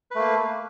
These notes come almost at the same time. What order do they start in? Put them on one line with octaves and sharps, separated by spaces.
B4 A3 A#3